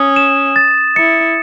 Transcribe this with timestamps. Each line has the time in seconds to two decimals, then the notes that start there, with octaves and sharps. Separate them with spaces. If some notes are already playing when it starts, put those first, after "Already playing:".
Already playing: C#4 D#6
0.16 E7
0.56 A6
0.96 E4 C#7